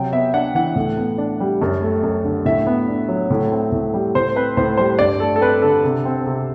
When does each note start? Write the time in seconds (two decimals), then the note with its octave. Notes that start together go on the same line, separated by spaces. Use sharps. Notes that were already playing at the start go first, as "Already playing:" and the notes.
Already playing: C3 F#3 G5
0.12 B3 E5
0.33 D4 F#5
0.55 E3 F#5
0.76 A2
0.97 B3
1.18 D4
1.40 G3
1.62 F#2
1.82 A3
2.03 F#2
2.25 D3
2.45 A2 E5
2.67 B3
2.88 D4
3.08 F#3
3.30 A2
3.52 C4
3.72 A2
3.94 G3
4.15 A2 C5
4.36 C4 B4
4.57 A2 C5
4.77 G3 C5
4.99 G2 D5
5.20 A3 A4
5.36 A4
5.41 C4 B4
5.62 D3 A4
5.84 C3
6.05 C4
6.27 C3